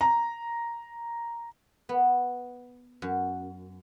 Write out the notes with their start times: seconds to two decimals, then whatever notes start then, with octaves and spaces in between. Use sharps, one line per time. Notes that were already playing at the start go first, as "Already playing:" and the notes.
0.01 A#5
1.89 B3
3.02 F#2